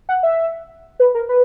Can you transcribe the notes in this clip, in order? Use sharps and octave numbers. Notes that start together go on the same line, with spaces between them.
F#5
E5
B4
A#4
B4